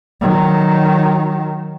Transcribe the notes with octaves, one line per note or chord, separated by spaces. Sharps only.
D#3 F#3